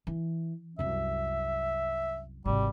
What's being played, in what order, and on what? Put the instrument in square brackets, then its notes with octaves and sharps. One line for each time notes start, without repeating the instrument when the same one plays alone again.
[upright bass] E3
[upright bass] C2 F#2 [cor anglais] E5
[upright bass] G#1 C3 [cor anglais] G3